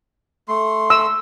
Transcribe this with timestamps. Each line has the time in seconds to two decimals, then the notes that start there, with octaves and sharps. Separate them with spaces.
0.48 A3 C6
0.90 E6